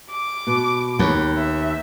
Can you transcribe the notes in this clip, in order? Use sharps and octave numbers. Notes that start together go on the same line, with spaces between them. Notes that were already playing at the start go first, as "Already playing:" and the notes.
D6
B2
D#2 B3 C#5
E5